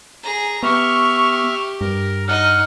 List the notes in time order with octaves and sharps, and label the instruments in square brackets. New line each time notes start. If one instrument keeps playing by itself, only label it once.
[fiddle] G#4 A#5
[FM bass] B3 [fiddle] G4 [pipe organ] E5 F6 [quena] C#6
[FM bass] G2 [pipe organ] A#4
[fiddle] D#4 D#5 [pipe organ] F#5 [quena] F6